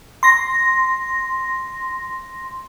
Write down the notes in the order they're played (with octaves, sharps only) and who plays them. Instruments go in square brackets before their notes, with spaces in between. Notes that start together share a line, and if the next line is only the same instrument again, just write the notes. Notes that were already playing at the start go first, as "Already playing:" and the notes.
[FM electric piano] C6 A#6